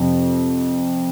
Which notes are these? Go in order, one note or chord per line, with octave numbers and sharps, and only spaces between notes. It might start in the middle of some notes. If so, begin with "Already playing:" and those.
Already playing: F2 C3